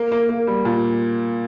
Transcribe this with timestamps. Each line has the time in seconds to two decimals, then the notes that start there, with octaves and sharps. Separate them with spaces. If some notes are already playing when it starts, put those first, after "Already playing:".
Already playing: A#3
0.12 A#3
0.29 A#3
0.47 G3
0.65 A#2